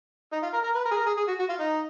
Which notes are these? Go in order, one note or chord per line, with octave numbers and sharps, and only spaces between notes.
D#4
F4
A#4
A#4
B4
A#4
G#4
A#4
G#4
G#4
F#4
F#4
F4
D#4